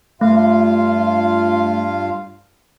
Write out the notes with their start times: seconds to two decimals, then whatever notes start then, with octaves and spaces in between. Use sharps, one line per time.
0.21 G2 A3 F4 F5